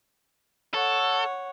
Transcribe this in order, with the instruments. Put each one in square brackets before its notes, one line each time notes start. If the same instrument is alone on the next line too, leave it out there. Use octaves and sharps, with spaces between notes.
[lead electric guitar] A4 [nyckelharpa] C#5 F#5